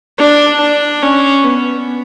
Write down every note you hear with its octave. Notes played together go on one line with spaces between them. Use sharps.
D4
D4
C#4
B3